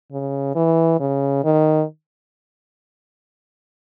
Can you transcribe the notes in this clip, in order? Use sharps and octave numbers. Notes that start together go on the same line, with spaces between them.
C#3
E3
C#3
D#3